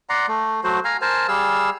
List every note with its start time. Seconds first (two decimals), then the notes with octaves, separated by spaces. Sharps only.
0.09 D5 F#5 A#5 C6
0.28 A3
0.64 F#3 A3 F#4 C5
0.84 F5 G#5 A#5
1.01 A#4 C5 G#5 A5
1.28 G3 G#4 F5 E6